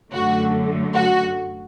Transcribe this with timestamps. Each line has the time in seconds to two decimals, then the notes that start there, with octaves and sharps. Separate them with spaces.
0.12 F#2 D3 F#3 A3 F#4
0.94 F#4